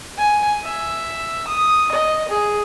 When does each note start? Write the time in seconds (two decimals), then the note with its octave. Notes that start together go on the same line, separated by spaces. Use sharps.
0.18 G#5
0.64 E5
1.48 D#6
1.92 D#5
2.29 G#4